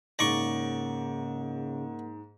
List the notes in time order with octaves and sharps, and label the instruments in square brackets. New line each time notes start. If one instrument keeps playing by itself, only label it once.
[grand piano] G#2 A#6 [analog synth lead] C#3 [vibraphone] A#3 A#4 F#5 [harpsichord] D5 C#6